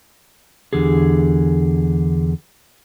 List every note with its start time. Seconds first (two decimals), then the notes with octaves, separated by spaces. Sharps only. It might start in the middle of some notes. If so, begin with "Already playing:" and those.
0.73 E2 D3 G4 G#4